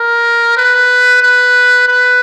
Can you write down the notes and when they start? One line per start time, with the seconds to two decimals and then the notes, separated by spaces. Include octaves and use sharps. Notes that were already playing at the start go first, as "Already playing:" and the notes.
Already playing: A#4
0.57 B4
1.22 B4
1.88 B4